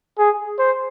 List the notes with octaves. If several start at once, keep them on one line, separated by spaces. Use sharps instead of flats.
G#4
C5